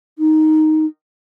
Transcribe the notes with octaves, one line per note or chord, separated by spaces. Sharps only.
D#4